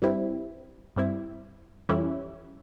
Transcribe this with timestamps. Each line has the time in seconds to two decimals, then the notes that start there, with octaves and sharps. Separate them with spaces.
0.02 G2 G3 C4 E4
0.96 G2 G3 C4 E4
1.89 F2 E3 G3 C#4 E4